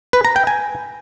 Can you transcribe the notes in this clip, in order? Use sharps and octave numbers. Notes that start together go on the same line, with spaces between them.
B4
A#5
G5
G#5